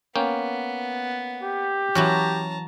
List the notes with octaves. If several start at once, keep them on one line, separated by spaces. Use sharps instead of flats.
A#3 B3 C#4 G5
G4
E3 F#3 C#4 F#4 A5 A#5